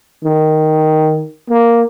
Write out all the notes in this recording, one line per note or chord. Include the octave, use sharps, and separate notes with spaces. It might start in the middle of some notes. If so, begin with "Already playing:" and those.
D#3
A#3